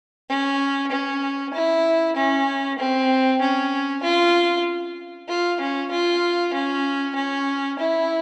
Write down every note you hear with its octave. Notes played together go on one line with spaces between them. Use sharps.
C#4
C#4
E4
C#4
C4
C#4
F4
F4
C#4
F4
C#4
C#4
E4